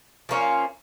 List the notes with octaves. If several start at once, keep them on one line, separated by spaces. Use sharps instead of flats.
F3 A#3 C#4 F4